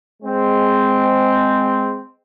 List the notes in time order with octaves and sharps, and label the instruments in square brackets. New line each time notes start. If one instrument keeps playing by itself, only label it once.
[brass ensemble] G#3 C4